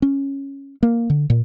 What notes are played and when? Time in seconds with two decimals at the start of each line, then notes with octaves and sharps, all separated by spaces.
0.02 C#4
0.83 A#3
1.10 D3
1.30 A#2